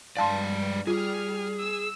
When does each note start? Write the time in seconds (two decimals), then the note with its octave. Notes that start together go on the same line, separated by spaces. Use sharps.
0.17 G2 G#3 D5 F5 A5 C6
0.87 G3 F4 G#4 F6
1.60 E6